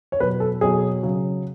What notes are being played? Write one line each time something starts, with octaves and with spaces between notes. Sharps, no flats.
C#5
B2 F#3 B4
A4
B2 F#3 G#4
C#3 F#3